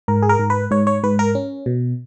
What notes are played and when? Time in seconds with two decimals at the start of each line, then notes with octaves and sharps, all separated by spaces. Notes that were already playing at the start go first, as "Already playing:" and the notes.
0.08 G#2 A#4
0.23 G#4
0.29 A#4
0.40 G#2
0.50 B4
0.71 G#2 C#5
0.87 C#5
1.04 G#2 B4
1.19 A#4
1.35 C#4
1.66 B2